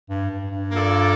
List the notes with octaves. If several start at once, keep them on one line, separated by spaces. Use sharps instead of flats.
G2
G2
G2
A#3 F4 A4 D5